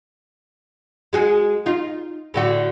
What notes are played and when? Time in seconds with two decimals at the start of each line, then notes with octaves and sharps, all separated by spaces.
1.13 G#3 F#4 G#4
1.66 D#4 F4
2.34 A2 D3 F#4